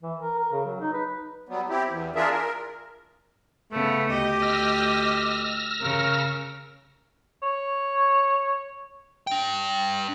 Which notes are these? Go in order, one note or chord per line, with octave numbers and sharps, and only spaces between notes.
E3
A#4
A#4
C#3
F#3
D#4
B4
F#3 G3 B3
C4 E4 G4
E2
D4 F4 G#4 A#4 E5
A#4
C#3 A3 B3
D2 G4 D#5
E6 F6 A#6
C#3 A#4
C#5
D4 G5